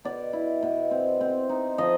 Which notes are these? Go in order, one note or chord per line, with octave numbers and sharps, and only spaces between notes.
B2 D5
E4
B2
C4
C4
D#4
F3 D#5